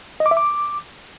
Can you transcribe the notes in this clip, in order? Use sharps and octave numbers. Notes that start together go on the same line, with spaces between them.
D#5
D6
E5
D6